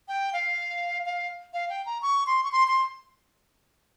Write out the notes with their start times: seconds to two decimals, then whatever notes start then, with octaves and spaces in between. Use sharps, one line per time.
0.08 G5
0.33 F5
1.06 F5
1.54 F5
1.70 G5
1.86 A#5
2.02 C#6
2.27 C6
2.44 C#6
2.52 C6
2.68 C6